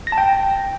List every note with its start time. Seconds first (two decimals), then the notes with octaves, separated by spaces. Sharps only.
0.07 A#6
0.12 A5
0.18 G5